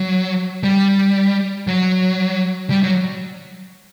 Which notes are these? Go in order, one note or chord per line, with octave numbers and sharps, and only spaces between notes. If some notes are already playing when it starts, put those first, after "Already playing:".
Already playing: F#3
G3
F#3
G3
F#3